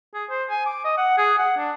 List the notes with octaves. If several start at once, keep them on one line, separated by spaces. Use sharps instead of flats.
G#4
C5
G#5
D6
D#5
F#5
G#4
F#5
D4